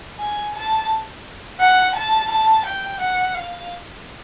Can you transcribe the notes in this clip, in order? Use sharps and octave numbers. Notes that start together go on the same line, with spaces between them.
G#5
A5
F#5
A5
A5
G5
F#5
F5